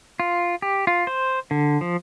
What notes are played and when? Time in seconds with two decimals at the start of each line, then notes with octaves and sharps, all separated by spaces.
0.20 F4
0.62 G4
0.87 F4
1.07 C5
1.51 D3
1.81 F3